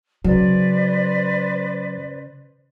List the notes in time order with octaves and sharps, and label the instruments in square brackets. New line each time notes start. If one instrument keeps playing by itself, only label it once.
[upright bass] C#3 [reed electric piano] F#3 [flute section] B4 C5 D5